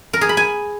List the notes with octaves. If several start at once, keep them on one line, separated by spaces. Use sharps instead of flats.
A#4
G#4
B5
G#5